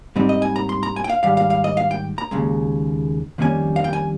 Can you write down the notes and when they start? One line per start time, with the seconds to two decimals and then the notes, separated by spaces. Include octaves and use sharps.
0.16 G#2 G3 C4 D#4
0.29 D#5
0.42 G#5
0.56 A#5
0.69 C6
0.83 A#5
0.96 G#5
1.04 G5
1.09 F5
1.23 G#2 D#3 G3 F5
1.37 F5
1.50 F5
1.64 D#5
1.77 F5
1.91 G5
2.18 A#5
2.31 D#2 C#3 G#3
3.38 F2 D#3 G3 A#3 C#4 G#5
3.76 F5
3.84 G5
3.93 G#5